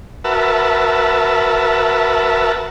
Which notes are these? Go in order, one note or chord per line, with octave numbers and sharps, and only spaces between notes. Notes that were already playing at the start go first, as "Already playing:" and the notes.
F#4 A#4 B4 E5 A5